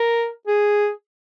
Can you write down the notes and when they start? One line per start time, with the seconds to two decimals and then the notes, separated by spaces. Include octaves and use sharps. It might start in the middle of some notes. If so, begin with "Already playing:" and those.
Already playing: A#4
0.47 G#4